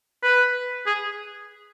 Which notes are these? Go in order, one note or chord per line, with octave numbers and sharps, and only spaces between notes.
B4
G#4